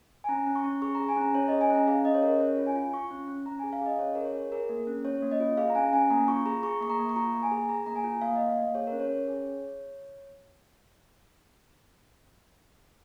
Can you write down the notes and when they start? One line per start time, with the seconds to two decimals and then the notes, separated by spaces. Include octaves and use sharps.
0.24 G#5
0.29 C#4 A#5
0.47 C#4
0.55 C#6
0.64 C#4
0.82 G#4 C#6
0.95 A#5
1.00 G#4
1.08 G#5
1.17 C#4 A#5
1.35 C#4 C#5
1.48 D#5
1.52 G#4
1.61 G#5
1.70 C#4 A#5
1.87 G#4 F5
2.05 C#4 D#5
2.14 C#5
2.23 G#4 A#4
2.40 C#4 C#5
2.58 F4
2.67 G#5
2.76 F4
2.93 F4 C#6
3.11 C#4
3.28 C#4
3.46 C#4 A#5
3.59 G#4 G#5
3.73 F5
3.81 G#4 D#5
3.99 C#4 C#5
4.15 G#4 A#4
4.25 C#5
4.34 F4
4.52 G#4 A#4
4.69 A#3
4.87 C#4
5.05 C#4 C#5
5.22 A#3
5.31 D#5
5.40 F4
5.57 G#4 F5
5.70 A#5
5.75 C#4 G#5
5.93 C#4 G#5
6.10 A#3 A#5
6.28 F4 C#6
6.46 G#4 A#5
6.63 G#4 C#6
6.81 A#3 C#6
6.90 A#5
6.99 A#3
7.09 C#6
7.16 F4 A#5
7.34 A#3
7.43 G#5
7.51 G#4
7.69 G#4 A#5
7.86 A#3 A#5
7.96 G#5
8.04 F4
8.21 A#3 F5
8.36 A#3 D#5
8.49 F5
8.58 A#3
8.75 G#4 C#5
8.87 C#4 A#4
9.00 C#5
9.10 C#4
9.28 G#4